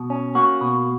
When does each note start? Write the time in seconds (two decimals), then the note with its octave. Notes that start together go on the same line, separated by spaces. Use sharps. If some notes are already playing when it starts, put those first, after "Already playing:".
Already playing: B2
0.10 C#4
0.35 A#3 F#4
0.61 B2